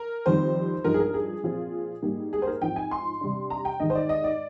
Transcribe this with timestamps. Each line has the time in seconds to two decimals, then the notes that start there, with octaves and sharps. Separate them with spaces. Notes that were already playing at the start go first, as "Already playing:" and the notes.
Already playing: A#4
0.26 F2 D#3 G3 C4 C5
0.84 G2 F3 G#3 D#4 A#4
0.94 G#4
1.00 A#4
1.14 G#4
1.43 A#2 F3 C4 F4
2.02 G#2 G3 A#3
2.33 G#4
2.42 C5
2.47 A#4
2.62 G#2 F3 C4 G5
2.76 G#5
2.91 C6
3.21 C3 G3 D4
3.50 A#5
3.65 G5
3.80 G#2 D#3 G#3 D#5
3.90 C5
3.95 D5
4.09 D#5
4.24 D5